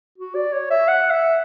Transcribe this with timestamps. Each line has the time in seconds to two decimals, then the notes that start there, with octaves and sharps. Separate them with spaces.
0.18 F#4
0.35 D5
0.53 C#5
0.70 E5
0.88 F#5
1.11 E5